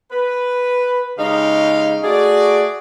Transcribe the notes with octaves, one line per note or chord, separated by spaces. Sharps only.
B4
C#3 G#3 D#4 G4 F5
A3 F#4 G#4 D5